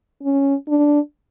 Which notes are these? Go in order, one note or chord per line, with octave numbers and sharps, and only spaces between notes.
C#4
D4